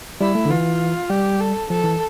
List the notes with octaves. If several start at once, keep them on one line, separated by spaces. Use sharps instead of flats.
G3 E4
A3
D3
E3 F4
G3 G4
A4
F3 A4
E3